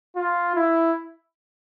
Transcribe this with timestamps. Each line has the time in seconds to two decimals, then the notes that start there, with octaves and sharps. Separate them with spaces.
0.16 F4
0.56 E4